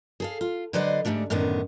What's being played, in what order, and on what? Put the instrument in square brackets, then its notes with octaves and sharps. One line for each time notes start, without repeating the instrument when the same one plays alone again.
[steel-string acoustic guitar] G#4 A4 F5
F4
D3 F#3 B4 C5 D5 D#5
G#2 F3 G3 A3 D4
F#2 A2 D3 D#3 B3